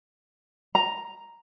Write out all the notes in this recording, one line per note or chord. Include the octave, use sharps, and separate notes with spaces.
A#5